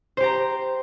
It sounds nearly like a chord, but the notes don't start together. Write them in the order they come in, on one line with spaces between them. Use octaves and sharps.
C5 G4 A#5